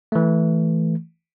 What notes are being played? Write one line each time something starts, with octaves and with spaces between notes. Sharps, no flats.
E3 A3